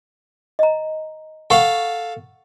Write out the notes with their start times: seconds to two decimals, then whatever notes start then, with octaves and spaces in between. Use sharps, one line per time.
0.59 D#5 A#5
1.50 A4 F5 F#5 C#6